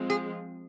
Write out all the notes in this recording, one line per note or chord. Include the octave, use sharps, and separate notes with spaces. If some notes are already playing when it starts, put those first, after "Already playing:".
Already playing: F3 G#3 C4
G#4